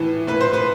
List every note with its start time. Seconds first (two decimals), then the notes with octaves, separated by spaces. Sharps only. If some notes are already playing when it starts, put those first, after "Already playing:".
Already playing: A2 E3
0.27 A2 B4
0.41 C5
0.53 B4